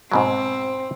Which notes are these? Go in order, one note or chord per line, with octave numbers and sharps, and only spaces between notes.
G#2 B2 F#3 C4